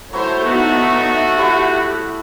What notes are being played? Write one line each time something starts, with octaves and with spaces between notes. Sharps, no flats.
F#3 A3 E4 C5 C#5
B3 D#4 F#4 E5
F3 E4 G4 F#5